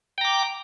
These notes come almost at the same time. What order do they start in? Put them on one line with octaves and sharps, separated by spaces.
G5 A#5 D6